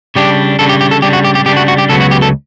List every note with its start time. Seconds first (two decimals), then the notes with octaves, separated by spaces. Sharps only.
0.16 C#3 G3 D4 G4
0.59 C#3 G3 D4 A4
0.69 G4
0.81 G4
0.91 A4
1.02 C#3 G3 D4 G4
1.13 F#4
1.25 G4
1.35 G4
1.46 C#3 G3 D4 G4
1.57 F#4
1.68 F#4
1.78 G4
1.89 C#2 C#3 F#3 B3 A4
2.01 F#4
2.11 G4
2.22 A4